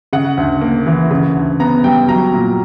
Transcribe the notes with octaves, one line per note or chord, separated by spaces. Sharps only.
C#3 F#5
D2
A#3
E3
C#3
D2
B3 A#5
G3 G5
F#3 A#5
A#2